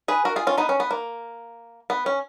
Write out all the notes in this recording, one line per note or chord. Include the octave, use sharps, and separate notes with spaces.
G#4 B4
F#4 A#4
F4 G#4
C#4 F4
B3 D#4
C#4
B3
A#3
B3
C#4